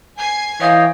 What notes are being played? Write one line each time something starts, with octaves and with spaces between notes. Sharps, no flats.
G#5 G#6 C7
E3 C#5 D#5 F5 G5